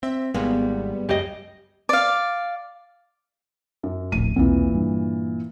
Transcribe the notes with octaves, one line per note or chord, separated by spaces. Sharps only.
C4 E5
G#1 G3 G#3 A#3 B3
C#2 F#2 C#3 G4 D#5
D5 F5
F#2
D1 A#1 A2 D#7
B1 E2 A#2 E3 C4
G2